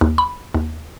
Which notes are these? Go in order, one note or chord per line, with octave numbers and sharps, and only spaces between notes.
D#2
B5
D#2